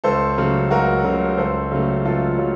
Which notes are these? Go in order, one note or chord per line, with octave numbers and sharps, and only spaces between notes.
C#2 A4 C5
C#3 F#3 A3
C#2 F#4 A#4
C#3 F#3 A3
C#2 A4 C5
C#3 F#3 A3
C#2 F4 A4
C#3 F#3 A3